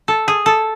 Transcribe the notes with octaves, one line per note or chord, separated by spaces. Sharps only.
A4
G#4
A4